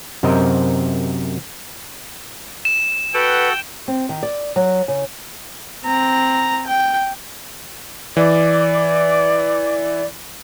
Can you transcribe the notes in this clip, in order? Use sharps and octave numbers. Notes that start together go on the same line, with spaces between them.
F#2 C3 C4 A#4 D#5 G5
E7
F#4 A4 B4 F#5 G5
C4
D#3
D5
F#3
C#3
C4 A#5
G5
E3 D5